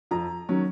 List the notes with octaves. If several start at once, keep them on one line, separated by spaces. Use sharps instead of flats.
F2 A#5
D#3 F#3 C#4